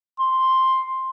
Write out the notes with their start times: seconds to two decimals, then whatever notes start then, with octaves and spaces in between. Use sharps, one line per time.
0.20 C6